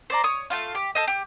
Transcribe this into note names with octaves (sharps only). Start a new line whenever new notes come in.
C5 D5 A#5
C#5 D#6
A3 F4 F5
G4
A4 C5 D#5
G4